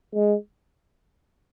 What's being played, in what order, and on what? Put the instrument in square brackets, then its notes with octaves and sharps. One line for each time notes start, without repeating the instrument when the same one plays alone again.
[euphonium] G#3